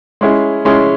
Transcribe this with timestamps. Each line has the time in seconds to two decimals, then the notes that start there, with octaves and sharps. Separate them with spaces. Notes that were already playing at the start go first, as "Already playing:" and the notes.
0.21 G#3 C#4 E4 G#4
0.65 G#3 C#4 E4 G#4